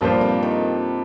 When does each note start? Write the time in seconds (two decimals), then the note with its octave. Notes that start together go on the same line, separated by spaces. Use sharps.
0.01 G2 A#2 F3 A#3 F4 C5
0.21 C3
0.43 D#3